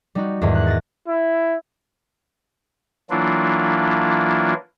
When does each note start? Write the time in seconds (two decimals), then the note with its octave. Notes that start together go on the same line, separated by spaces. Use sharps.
0.15 G3 D#4 F#4
0.41 E2 G#2 D#3 G3
0.55 F#6
0.67 A6 A#6
1.07 E4
3.10 E3 F#3 A#3 D4 E4 F4